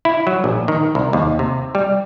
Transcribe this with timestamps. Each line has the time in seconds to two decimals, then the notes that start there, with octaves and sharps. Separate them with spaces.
0.05 E4
0.27 F#3
0.44 A#1
0.68 D#3
0.95 C2
1.13 D#2
1.39 C3
1.75 G3